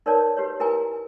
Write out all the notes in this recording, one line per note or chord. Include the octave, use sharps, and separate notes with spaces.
D#4 A#4 B4 C#5 D5 A5
G4 B4 C#5
E4 A#4 B4 G#5 A#5